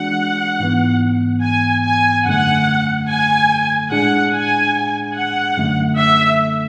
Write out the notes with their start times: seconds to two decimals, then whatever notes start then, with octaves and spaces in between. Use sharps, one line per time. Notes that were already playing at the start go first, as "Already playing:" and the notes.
Already playing: E3 G#3 D4 F#4 F#5
0.60 G#2 E3 B3
1.43 G#5
1.85 G#5
2.25 F#2 D3 A3 F#5
3.08 G#5
3.91 A2 G#3 D4 G#4 F#5
4.33 G#5
5.16 F#5
5.57 F#2 D3 A3
5.99 E5